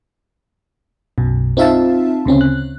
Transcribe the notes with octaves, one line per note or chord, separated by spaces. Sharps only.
B1 F#2 B2
C4 D#4 F4 E5 F5 A5
D2 C#3 C4 C#4
F#6